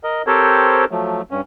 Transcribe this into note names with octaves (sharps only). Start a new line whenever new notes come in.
A#4 D#5
C4 G4 A4 A#4 C5 C#5
F3 F#3 A3
G2 C#4